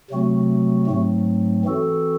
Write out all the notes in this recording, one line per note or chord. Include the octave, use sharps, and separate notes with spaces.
C3 F#3 A3 C4 F#4
G#2 F#3 A3 C4
E3 C4 F#4 A4